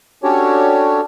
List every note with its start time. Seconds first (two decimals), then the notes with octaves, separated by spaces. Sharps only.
0.23 C#4 D4 F#4 G4 A4 C#5